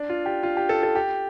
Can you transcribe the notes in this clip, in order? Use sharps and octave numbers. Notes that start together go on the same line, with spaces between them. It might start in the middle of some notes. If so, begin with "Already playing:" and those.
Already playing: D4
F4
G4
F4
G4
A4
A4
G4